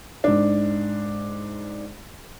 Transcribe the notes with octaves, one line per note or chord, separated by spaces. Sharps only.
G#2 D4